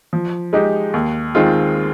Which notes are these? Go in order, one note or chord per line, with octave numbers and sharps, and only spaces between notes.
F3
G#3 D#4 G4
D#2
D#3 G#3 C4 F4